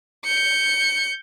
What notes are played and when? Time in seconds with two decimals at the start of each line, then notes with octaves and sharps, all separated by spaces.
0.25 G6 C#7